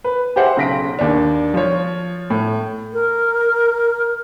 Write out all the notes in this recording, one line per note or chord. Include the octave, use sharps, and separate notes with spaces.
B4
G4 G#4 C5 E5 F#5
B1 C#3 C6 A#6 B6 D7
D#2 D4
F3 F4 C#5
A2
A#4